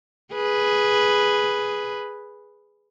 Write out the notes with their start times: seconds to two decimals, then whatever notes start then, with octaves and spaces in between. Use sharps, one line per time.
0.33 G#4 B4